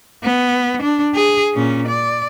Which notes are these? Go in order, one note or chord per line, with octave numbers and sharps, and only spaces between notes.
B3
D4
G#4
A#2 C#4
D5